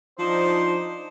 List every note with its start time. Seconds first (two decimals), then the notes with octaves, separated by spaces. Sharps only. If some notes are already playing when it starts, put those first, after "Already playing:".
0.19 F3 D4 D#4 C5